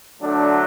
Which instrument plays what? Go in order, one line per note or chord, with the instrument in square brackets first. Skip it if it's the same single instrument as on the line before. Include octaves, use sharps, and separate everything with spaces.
[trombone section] D3 F#3 A3 D4